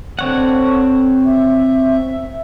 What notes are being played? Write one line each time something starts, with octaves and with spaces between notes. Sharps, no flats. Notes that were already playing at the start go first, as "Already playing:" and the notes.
D3 C4 C#5 F#5
E5